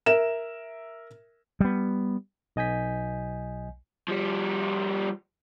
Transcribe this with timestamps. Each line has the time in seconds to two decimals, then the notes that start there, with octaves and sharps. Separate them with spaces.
0.06 A#4 E5 E7
1.60 G3 B3
2.56 B1 D#5 G#5 G6 B6
4.08 F3 G3